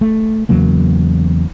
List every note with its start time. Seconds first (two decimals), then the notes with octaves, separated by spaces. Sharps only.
0.01 A3
0.49 E2 C#3 F#3 A#3